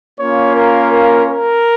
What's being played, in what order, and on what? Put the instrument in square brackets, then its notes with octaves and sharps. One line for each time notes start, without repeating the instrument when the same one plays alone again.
[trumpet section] A#3 C#4 F4 C#5
A#4
A#4
A#4